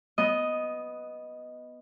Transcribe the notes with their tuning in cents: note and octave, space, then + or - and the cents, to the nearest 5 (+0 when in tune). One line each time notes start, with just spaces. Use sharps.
B3 +0 D#5 +5